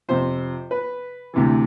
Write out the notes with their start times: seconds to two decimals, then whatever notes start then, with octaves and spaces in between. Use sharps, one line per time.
0.08 F2 C3 F3 C5
0.71 B4
1.34 D2 C3 E3